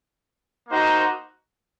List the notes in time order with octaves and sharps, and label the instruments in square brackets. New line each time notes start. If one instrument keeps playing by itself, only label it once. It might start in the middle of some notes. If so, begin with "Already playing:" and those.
[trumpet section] A#3 D#4 F#4 C5